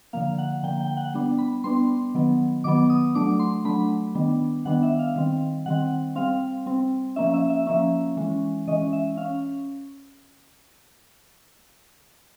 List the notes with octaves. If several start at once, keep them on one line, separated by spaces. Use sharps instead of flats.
D3 F3 A#3 F5
F#5
D3 F3 A#3 G5
G5
F#5
G3 B3 D4
B5
G3 B3 D4 C6
D#3 F#3 B3
D#3 F#3 B3 D6
D#6
F#3 A3 D4 D6
C6
F#3 A3 D4 B5
D#3 G3 B3 D4
D#3 G3 B3 D4 F#5
E5
F5
D#3 G3 C4
D#3 G3 C4 F#5
G3 C4 F5
G3 C4
F3 A#3 C#4 E5
E5
E5
F3 A#3 C#4 E5
E3 G#3 C#4
E3 G#3 C#4 D#5
E5
C#4 F5